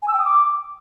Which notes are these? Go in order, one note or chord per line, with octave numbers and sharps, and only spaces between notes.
G#5
E6
G5
D#6
D6